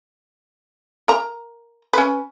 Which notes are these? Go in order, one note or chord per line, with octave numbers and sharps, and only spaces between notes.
A#4 A#5
C#4 B4